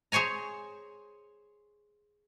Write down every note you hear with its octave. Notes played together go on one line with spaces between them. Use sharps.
G#4 C5 C#5 G#5 A#5